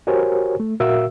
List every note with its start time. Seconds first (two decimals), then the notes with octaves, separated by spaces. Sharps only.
0.07 F#4 G4 A#4 C5 C#5 G#5
0.60 A3
0.80 A#2 F#4 A#4 E5 F5 E6